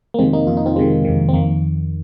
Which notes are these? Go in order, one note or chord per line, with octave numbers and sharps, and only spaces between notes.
A#3
F2 C3 D#3 G#3 C4
A#3 D#4
F2 C3 D#3 F4
D#4
C4 F4
F2 C3 D#3 G#3 C4
F2 C3 D#3
C4
F2 D#3 A#3